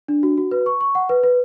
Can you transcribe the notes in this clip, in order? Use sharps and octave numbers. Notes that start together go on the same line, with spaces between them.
D4
F#4
F#4
B4
C#6
C#6
F#5
B4
B4